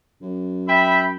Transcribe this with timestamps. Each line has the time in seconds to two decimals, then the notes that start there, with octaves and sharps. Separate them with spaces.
0.21 F#2
0.68 E5 G5 B5